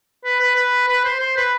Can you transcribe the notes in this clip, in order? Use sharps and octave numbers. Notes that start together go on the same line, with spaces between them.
B4
B4
B4
B4
C5
C5
B4